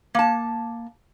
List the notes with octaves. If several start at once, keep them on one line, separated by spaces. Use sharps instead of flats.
A#3 A5